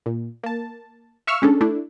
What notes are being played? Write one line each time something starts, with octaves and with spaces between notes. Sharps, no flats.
A#2
A#3 A5
E5 F5 C#6 E6 F6
G#3 C#4 D4 A4
A3 D4 E4